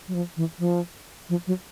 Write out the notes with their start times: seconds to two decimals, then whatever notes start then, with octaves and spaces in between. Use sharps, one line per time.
0.08 F#3
0.14 F3
0.37 E3
0.59 F3
1.29 F3
1.47 F#3